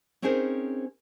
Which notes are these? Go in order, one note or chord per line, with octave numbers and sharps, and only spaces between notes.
C4 C#4 D#4 G#4 A#4 C5